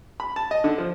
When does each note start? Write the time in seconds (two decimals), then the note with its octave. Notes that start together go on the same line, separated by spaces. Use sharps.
0.20 B5
0.36 A5
0.51 D#5
0.64 D3
0.78 F3